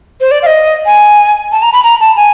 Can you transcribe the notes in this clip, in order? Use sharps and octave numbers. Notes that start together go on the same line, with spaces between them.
C5
D5
F5
D#5
G#5
A5
A#5
B5
A#5
A5
G#5